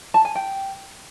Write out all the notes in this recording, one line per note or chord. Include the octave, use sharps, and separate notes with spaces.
A5
G#5
G5